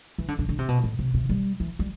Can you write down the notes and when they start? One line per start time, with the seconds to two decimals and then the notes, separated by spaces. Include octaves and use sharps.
0.18 E3
0.28 D3
0.39 D3
0.49 D3
0.59 C3
0.68 B2
0.84 A2
0.99 C3
1.14 C3
1.29 G3
1.60 E3
1.79 G3